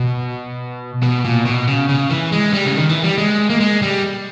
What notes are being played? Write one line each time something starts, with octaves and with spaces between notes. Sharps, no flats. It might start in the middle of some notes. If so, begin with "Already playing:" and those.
Already playing: B2
B2
A#2
B2
C#3
C#3
E3
G#3
G3
C#3
D#3
E3
G3
G#3
A#3
G#3
G3